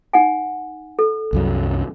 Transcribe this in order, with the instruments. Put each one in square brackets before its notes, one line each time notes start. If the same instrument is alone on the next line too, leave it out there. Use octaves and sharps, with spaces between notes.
[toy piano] D#4 F#5 G#5
A4
[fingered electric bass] C2 F#2 F#3